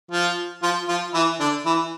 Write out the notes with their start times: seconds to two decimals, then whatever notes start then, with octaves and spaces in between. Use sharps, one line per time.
0.11 F3 F4
0.63 F3 F4
0.88 F3 F4
1.13 E3 E4
1.40 D3 D4
1.65 E3 E4